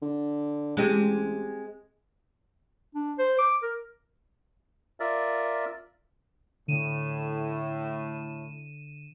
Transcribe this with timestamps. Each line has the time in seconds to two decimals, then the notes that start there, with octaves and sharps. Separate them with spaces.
0.02 D3
0.77 A1 G#3 C4 G4
2.95 D4
3.18 C5
3.38 D6
3.62 A#4
5.00 F4 A#4 D5 E5
6.68 A2 D3 D#7 E7